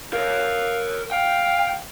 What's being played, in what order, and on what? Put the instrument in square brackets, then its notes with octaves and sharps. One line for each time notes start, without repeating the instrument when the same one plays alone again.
[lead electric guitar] A#4 C#5 [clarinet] F5
[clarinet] F5 [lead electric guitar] G5